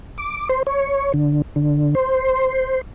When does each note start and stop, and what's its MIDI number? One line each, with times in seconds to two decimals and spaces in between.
0.18 0.48 86
0.49 0.63 72
0.67 1.12 73
1.14 1.42 50
1.56 1.95 50
1.95 2.81 72